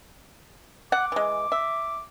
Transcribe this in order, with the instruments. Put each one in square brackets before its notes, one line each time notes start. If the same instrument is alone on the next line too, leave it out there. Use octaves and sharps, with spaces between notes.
[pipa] F#5 [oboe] D6
[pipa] E3 G#3
E5